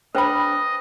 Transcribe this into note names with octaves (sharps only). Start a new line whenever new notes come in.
D4 B4 C5 D#5 G5 B5